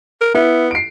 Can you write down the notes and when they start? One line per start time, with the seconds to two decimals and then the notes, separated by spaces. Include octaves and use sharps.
0.21 A#4
0.34 B3 E4
0.71 C7 D7